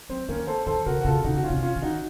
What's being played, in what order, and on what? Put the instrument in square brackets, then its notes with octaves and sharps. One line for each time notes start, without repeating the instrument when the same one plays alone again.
[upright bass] F#3 [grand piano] C4
[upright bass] D#3 [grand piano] A#3 C#4
[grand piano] A4 C5
[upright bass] D#3 [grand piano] A4 C5
[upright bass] C#3 [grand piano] F#4 A#4
[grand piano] F#4
[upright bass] C#3 [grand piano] F4 A4
[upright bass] C#3 [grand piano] D#4 F#4
[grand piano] F#4
C#4 F4
[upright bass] C3
[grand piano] C#4 F4
[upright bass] D#3
[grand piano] D#4 F#4